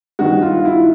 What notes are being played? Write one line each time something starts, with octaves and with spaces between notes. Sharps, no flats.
G2 D#3 F#4
F4
E4